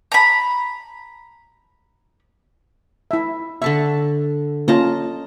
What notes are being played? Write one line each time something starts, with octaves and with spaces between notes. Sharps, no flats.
A#5 B5
E4 E5
D3 E5 A5 C#6
A#3 C#4 F4 D#5 A5 A#5